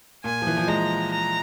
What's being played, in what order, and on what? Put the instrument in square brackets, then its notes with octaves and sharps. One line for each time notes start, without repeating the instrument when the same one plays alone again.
[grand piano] A#2 [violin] G#5
[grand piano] F3
E3
F3
[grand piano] G#3 [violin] A#5
[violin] A#5